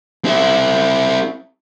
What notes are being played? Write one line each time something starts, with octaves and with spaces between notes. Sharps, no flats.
C4 E4